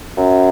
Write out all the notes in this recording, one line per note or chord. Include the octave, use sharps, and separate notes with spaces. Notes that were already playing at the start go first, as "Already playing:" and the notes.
F#2